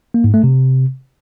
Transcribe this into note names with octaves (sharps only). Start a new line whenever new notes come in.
A#3
G#2
A3
C3